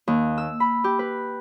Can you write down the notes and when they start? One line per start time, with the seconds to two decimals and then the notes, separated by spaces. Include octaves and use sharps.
0.08 D#2
0.38 E6
0.60 B5
0.84 G4
0.99 B4